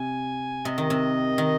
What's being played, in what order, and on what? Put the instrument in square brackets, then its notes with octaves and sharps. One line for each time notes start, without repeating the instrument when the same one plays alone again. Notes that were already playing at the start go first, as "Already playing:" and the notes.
Already playing: [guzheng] C3 [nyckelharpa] G#5
[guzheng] C3 [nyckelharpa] D#5
[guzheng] D#3
C3
D#3